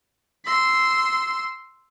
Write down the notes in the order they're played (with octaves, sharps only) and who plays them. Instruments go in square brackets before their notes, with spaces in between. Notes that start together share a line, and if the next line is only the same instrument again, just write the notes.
[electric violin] C6 E6